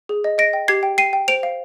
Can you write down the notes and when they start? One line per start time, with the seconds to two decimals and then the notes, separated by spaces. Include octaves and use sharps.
0.09 G#4
0.24 D#5
0.38 D#5 A#6 D7
0.53 G5
0.68 G4 G#6 C7
0.83 G5
0.98 G5 C7 D#7
1.13 G5
1.28 C5 D7 F7
1.43 F5